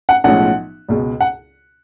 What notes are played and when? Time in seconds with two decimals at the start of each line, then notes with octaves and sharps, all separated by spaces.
0.09 F#5
0.24 B1 A2 F3 G#3 C#4 F#5
0.88 C#2 B2 G#3
1.20 F#5